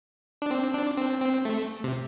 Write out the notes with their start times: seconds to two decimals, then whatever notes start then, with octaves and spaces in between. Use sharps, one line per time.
0.42 D4
0.51 C4
0.74 D4
0.97 C4
1.21 C4
1.45 A3
1.84 C3